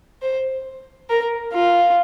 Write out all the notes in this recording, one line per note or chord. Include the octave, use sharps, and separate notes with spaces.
C5
A#4
F4